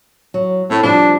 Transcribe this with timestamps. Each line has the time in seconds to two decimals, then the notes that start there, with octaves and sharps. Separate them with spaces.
0.34 F#3
0.70 A2 C4
0.83 C3 F3 G3 D4